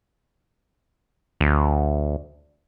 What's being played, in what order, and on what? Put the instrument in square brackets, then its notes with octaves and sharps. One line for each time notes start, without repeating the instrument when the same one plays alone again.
[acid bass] D2